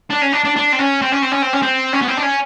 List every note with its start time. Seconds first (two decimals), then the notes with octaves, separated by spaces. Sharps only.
0.10 D4
0.21 C#4
0.32 D4
0.44 D4
0.56 D4
0.72 C4
0.79 C#4
1.02 C4
1.12 C#4
1.22 C4
1.32 C#4
1.42 C4
1.53 C#4
1.62 C4
1.93 C#4
2.02 B3
2.08 C4
2.18 D4
2.23 C#4